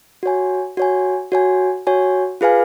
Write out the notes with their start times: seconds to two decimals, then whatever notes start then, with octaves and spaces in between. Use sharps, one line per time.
0.23 F#4 C#5 G#5
0.77 F#4 C#5 G#5
1.32 F#4 C#5 G#5
1.87 F#4 C#5 G#5
2.41 F4 G#4 B4 F5 G#5